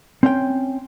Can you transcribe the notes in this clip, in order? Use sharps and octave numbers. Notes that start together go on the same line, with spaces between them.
C4 C#4 G5